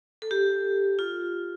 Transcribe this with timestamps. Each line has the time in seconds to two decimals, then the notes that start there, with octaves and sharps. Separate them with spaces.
0.22 A4
0.31 G4
0.99 F4